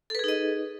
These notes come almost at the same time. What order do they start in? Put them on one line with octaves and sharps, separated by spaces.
A4 B4 G#4 D#4 D#5